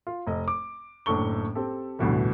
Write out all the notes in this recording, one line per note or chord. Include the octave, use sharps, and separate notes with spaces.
F4
F1 D#5
D6
F#1 A2 D4 A4 C#6 G7
C4 G4 A4
A1 D2 G2 B2 E3 G3